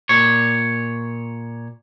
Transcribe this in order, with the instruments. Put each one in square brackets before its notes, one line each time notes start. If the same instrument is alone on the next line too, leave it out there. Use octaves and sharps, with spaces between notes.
[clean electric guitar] A#2 C#5